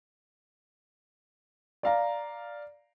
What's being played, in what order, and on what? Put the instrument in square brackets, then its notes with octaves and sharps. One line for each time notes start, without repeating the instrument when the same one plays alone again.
[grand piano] D5 F5 A#5